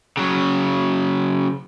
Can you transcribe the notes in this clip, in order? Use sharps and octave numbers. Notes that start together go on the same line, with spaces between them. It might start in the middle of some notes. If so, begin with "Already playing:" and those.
C#3 F#3